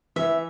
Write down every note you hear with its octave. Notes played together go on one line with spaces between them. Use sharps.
E3 E5